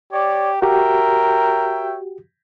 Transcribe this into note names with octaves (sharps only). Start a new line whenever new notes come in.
G4 C#5 D5
F#4 G4 A#4 C#5 E5 G5